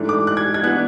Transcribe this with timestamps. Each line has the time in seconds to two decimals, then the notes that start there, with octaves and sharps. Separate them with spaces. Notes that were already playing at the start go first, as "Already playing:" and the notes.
Already playing: G#2 E3 A3 D4
0.09 D6
0.27 F#6
0.37 G#6
0.54 G#6
0.63 E3 B3 D4 F#6